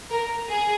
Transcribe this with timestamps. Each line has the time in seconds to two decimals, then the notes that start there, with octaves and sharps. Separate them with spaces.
0.10 A#4
0.47 G#4